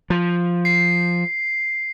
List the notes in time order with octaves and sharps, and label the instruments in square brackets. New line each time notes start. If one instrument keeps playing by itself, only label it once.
[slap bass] F3
[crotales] C7